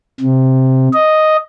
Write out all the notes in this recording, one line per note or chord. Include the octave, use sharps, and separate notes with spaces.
C3
D#5